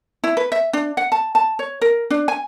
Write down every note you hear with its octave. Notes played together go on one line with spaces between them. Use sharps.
E4
B4
E5
D4
F#5
A5
A5
C#5
A#4
D4
G#5